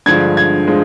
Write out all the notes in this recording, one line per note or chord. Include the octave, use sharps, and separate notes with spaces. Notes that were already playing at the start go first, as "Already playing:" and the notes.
G2 D3 F3 G#3 G#6
G#6
F3 G#3